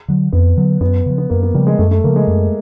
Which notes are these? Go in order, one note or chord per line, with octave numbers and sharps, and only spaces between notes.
D3 F#3
F2 B3
D3 F#3
F#2 B3
C#3 F3
B3
F#2 A#3
B3
C#3 F3 G3
G#3
F#2 A3
A3
C#3 F3 A#3
G#3
F#2